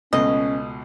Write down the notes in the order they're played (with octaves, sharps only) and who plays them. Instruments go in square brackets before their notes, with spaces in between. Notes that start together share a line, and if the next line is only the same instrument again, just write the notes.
[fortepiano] C#2 B2 A3 [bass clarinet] C#4 [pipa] D#5